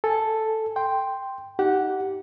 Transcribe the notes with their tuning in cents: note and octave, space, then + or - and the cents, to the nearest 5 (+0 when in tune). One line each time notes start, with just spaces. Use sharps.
A4 +0 G#5 +0
G5 +0 C6 +0
D#4 +20 G4 -20 F#5 +0